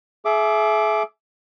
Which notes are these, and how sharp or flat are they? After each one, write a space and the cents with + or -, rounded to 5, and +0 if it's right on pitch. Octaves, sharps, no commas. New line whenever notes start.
G#4 +40 E5 +10 D6 +0